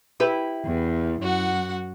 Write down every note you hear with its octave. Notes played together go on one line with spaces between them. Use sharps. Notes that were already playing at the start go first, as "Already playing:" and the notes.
E4 G4 B4
E2
F#2 F#4 F#5